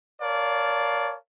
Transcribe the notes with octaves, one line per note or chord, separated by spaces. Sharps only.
A#4 C#5 D5 F5 A5